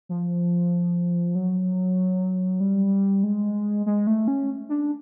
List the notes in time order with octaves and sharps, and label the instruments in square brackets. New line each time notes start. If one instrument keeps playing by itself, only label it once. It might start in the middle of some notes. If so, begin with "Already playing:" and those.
[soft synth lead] F3
F#3
G3
G#3
G#3
A3
C#4
D4